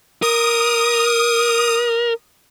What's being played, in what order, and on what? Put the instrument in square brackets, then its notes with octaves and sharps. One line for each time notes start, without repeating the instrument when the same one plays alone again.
[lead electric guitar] A#4 [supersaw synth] D#6